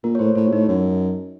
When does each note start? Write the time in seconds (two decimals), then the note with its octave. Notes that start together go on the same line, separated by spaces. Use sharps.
0.04 A#2 A#4
0.15 C#5
0.19 A2 C5
0.35 A2 C#5
0.48 A#2
0.52 A2 D#4
0.68 F#2 D#4